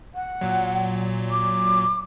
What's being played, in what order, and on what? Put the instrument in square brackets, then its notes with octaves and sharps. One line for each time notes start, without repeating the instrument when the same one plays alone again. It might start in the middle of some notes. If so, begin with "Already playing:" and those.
[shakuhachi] F#5
[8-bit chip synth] A#2 F#3
[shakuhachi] D6